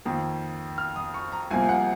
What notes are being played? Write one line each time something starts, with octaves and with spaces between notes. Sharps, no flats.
F2 D#3 A#3
F6
D#6
C#6
A#5
C2 C3 F3 A#3 G#5
G#5
F#5